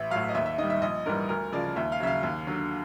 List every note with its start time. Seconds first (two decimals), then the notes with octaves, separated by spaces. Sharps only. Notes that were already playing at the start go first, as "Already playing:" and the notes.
Already playing: A1 E5
0.11 A2 F#3 F5
0.29 D#5
0.35 D#2 E5
0.46 E5
0.58 D#3 G3 D#5
0.70 E5
0.82 A#1 D#5
1.06 G#2 E3 G3 A#4
1.29 D2 A#4
1.52 C#3 F3 G#3 D5
1.76 D#2 E5
1.92 F5
2.00 C#3 F#3 E5
2.07 F5
2.23 D#2
2.47 D3 F#3